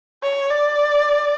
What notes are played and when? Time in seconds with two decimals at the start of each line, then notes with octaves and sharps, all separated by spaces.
0.23 C#5
0.51 D5